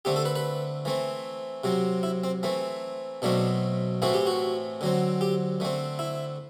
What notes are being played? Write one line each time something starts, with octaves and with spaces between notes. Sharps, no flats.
D3 A3 C4 G4
A4
B4
B4
E3 A3 C4
C3 F#3 C4
E4
C4
E3 A3 C4
B2 F#3 A3 C4 D4
A2 E3 A3 C4 F#4
G4
F#4
D3 F#3 C4
G4
D3 A3 C4
E4